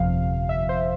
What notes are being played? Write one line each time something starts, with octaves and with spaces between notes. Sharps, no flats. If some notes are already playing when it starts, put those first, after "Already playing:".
Already playing: G1 F2 C3 F3 F5
E5
C5